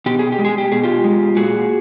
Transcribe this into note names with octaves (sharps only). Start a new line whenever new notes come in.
B2 G4
G#4
G4
G#3
G#4
G4
B2 G#4
F4 G4
G#3
A#2 F#4 G#4